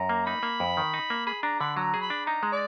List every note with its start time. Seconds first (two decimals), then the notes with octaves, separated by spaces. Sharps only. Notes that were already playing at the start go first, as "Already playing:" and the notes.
Already playing: F#2 A#5
0.09 A#3
0.26 D#4 B5
0.43 A#3
0.60 F2
0.77 D#3
0.94 D#4
1.10 A#3
1.27 G#4 B5
1.43 D4 A#5
1.59 D3 B5
1.76 F#3 A#5
1.94 G#4
2.02 B5
2.10 D4
2.26 D#4 A#5
2.43 G#3
2.52 D5